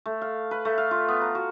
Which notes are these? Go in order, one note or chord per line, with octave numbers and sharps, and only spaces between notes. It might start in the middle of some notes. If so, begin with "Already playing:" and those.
A3
F5
B4
A3
F5
F4
B3
A#5
F#4